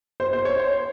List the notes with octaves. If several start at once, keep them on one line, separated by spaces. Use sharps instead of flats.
C5
C5
C#5
C5